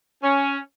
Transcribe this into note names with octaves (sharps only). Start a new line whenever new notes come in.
C#4